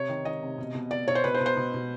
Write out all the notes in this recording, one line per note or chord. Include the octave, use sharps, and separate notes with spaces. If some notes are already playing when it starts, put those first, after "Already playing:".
Already playing: C3 C#5
D#3
D#3 D#5
C3
B2
B2
B2 D5
B2 C#5
C5
B2 B4
C5
B2
C5
B2
B2